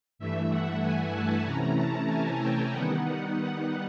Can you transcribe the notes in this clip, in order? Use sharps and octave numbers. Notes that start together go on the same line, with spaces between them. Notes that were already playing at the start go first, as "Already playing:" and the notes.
G2 E3 A3 E5
F#5
G#5
A5
C3 E3 A3 C#4 E4 A#5
A5
G#5
G5
D#3 G3 B3 D#4 F#5
F#5